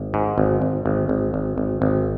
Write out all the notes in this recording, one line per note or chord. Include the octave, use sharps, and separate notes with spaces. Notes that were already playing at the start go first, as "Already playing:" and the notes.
Already playing: G#1
G#2
G#1
G#1
G#1
G#1
G#1
G#1
G#1